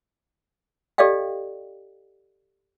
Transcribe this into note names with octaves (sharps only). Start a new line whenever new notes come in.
G4 A4 D5 D#5 F5 G5